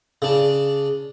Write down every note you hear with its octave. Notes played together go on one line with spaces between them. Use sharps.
C#3 D4